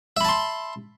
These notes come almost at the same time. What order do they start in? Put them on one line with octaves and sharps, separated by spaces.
E5 B5 A5 C6